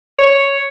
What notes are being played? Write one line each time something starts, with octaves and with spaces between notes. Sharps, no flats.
C#5